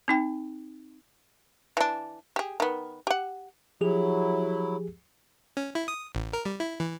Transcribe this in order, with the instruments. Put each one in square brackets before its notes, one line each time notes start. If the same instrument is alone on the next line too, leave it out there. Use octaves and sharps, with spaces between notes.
[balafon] C4 D#4 G5
[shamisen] E3 D4
G4 G#4
D#3 B3
G4 F#5
[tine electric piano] F3 G4 G#4 [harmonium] F#3 E4
[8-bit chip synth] C#4
E4
D#6
A1
A#4
G3
E4
E3